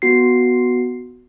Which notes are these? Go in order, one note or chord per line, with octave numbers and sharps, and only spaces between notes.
B3 F#4 C7